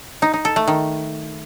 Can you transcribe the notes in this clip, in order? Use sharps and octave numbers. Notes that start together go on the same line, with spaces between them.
D#4
D#4
A4
A3
D#3